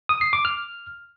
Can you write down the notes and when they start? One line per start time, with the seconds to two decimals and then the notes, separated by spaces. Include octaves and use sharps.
0.09 D#6
0.21 C7
0.33 D6
0.45 F6